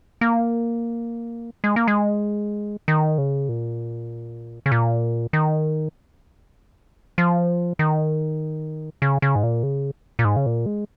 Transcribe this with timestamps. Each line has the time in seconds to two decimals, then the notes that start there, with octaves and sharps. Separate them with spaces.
0.21 A#3
1.64 G#3
1.76 A#3
1.88 G#3
2.88 D#3
3.18 C#3
3.49 A#2
4.66 C#3
4.72 A#2
5.33 D#3
7.18 F3
7.79 D#3
9.02 C#3
9.22 C#3
9.36 G#2
9.43 A#2
9.63 C#3
10.19 A#2
10.25 G#2
10.36 C#3
10.46 A#2
10.66 G#3